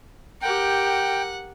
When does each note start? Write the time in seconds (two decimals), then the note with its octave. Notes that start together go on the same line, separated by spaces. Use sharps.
0.42 G4 A#4 F#5 G5